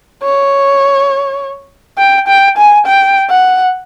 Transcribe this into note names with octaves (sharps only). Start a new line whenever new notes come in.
C#5
G5
G5
G#5
G5
F#5